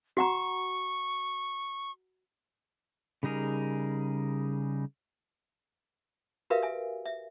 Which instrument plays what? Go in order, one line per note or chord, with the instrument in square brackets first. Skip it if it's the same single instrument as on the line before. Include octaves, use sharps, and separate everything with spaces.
[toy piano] F#4 F#5 A#5 [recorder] C#6
[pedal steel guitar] C#3 G3 D#4 G#4 A#4
[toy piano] F#4 G4 A#4 B4 E5 F5
E5 G#5
E5